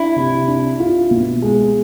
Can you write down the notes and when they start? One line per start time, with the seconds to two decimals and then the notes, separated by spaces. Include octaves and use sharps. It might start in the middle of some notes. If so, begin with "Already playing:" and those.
Already playing: D4 E4
0.16 C3
0.48 D4
0.80 F4
1.11 B2
1.42 G#3